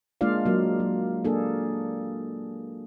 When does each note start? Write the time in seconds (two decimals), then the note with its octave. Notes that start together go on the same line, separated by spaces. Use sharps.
0.21 G#3 A#3 D4 F4 D5 F5
0.45 F#3 A#3
0.80 F#3
1.25 A#3 D4 G#4 A4